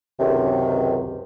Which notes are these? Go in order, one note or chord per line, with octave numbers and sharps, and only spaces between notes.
C#2 F#2 C3 D#3